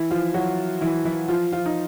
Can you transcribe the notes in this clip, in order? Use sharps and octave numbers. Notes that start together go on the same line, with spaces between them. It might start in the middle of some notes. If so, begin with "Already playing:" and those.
Already playing: E3 E4
F3 F4
F#3 F#4
E3 E4
E3 E4
F3 F4
F3 F4
D#4